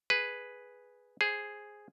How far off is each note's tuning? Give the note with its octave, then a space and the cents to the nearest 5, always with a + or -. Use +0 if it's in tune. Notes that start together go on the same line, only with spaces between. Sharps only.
G#4 +0 B4 +0
G#4 +0 C5 +0